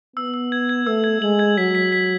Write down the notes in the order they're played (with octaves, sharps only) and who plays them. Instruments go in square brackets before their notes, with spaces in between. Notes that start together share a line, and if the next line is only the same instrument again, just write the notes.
[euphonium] B3 [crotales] E6
[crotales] E6
G#6
G#6
[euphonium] A3 [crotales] E6
[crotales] G#6
[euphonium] G#3 [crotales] F#7
[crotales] G#6
[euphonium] F#3 [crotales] B6
[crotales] B6
B6